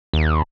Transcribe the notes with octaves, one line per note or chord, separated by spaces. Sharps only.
D#2